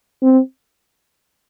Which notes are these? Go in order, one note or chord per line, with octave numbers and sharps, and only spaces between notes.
C4